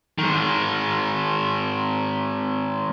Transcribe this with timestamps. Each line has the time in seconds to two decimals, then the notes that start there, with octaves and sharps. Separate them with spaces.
0.18 D#3 G#3